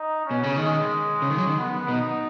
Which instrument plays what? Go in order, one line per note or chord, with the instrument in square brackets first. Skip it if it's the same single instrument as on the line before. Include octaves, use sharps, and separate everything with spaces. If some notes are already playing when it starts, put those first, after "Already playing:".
Already playing: [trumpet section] D#4
C#4
[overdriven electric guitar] B2
C#3
[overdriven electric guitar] D#3 [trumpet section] G#3
[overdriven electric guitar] C#3
D#3
F#3
D#3
[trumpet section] B3
[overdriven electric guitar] B2 [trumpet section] D#4